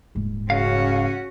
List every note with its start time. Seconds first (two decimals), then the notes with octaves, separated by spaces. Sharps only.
0.15 D#1 G#2
0.50 C#3 C#4 F#4 F5